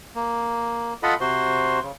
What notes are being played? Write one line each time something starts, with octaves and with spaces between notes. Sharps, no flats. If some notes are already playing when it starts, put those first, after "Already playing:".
A#3
F4 A4 D#5 F#5 B5
C3 F#4 C5 C6
C#3